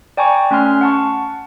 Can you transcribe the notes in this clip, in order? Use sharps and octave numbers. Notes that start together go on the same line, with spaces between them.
D5 G5 G#5 A#5 C#6
A3 C#4 G#5 C6 F6
F#5 A5 C#6